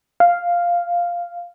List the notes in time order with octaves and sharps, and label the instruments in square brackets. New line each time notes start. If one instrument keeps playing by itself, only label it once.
[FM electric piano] F5